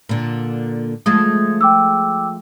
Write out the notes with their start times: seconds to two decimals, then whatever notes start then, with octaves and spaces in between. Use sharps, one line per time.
0.09 A#2 D3
1.06 F3 G#3 A3 D#6 G#6
1.61 G5 D6 E6